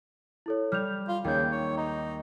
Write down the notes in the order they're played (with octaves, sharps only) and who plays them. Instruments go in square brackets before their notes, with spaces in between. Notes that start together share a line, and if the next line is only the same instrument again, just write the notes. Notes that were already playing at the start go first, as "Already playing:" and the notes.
[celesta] E4 A4 C#5
[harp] G3 [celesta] F6 G6 F7
[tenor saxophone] F4 [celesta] F5
[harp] D#2 G6 [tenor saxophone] C#3 [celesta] G5
[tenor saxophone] C#5
[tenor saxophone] D#4 [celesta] A#5